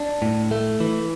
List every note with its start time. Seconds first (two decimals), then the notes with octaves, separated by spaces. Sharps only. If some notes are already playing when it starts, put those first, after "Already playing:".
Already playing: D4
0.22 A2
0.51 A3
0.80 E3